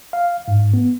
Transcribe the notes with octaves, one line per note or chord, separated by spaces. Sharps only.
F5
G#2
B3